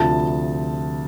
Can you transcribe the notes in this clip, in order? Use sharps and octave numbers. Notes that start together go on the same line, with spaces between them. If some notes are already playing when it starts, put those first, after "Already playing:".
Already playing: D2 C3 F3 A5